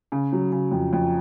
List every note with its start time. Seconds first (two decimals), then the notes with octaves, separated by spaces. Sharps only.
0.12 C#3
0.32 F#3
0.52 C#3
0.71 F2
0.93 F2